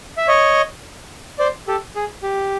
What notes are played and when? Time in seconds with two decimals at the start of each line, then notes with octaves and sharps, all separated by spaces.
0.17 E5
0.28 C#5 D#5
1.39 C5 D5
1.68 G4 A4
1.96 G#4
2.23 G4